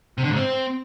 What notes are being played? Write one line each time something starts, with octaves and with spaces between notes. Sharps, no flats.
C3
D3
G#2
C4